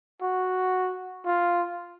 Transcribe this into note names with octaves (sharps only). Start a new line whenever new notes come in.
F#4
F4